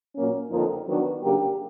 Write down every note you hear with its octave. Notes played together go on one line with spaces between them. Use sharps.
A#2 F#3 A#3 C#4
F2 D3 F3 A#3 D#4
D#3 F#3 B3 D4 F#4
C#3 F#3 A#3 D4 G4